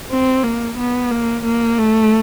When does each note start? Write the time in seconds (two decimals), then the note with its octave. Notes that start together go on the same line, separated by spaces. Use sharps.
0.10 C4
0.43 A#3
0.77 B3
1.11 A#3
1.45 A#3
1.78 A3